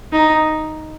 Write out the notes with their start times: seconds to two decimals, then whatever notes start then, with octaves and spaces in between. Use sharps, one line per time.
0.12 D#4